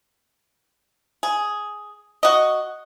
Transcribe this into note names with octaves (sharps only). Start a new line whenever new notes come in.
G#4
F#4 D#5